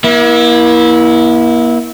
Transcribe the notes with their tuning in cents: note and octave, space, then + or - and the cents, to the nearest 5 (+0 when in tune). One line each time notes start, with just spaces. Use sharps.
A#3 +40 E4 -15